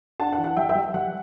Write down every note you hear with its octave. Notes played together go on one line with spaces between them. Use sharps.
D4 F#5 A5
F#5
E3
F#5
G3 E5 G5
E5 G5
G3
G3 F#5